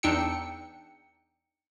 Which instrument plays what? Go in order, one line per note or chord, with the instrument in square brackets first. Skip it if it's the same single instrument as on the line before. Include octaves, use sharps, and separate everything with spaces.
[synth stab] E2 D4 D#4 G5 E6 C#7